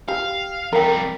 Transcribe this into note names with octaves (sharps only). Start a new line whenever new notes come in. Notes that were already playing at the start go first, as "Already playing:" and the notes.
G4 F5
F2 G3 A#4 G5